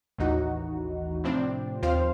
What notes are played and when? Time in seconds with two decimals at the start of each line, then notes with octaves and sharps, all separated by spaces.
0.18 A1 D#2 E3 D#4 F#4
1.24 A2 C3 F3 C4 D4
1.82 D#2 F3 C4 C5 F5